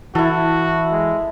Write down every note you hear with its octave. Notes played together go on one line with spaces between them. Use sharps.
E3 E4 F#4 A4
G#3